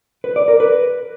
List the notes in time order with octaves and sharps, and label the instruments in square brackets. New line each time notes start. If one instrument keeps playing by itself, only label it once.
[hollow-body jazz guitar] B4
D5
A#4
B4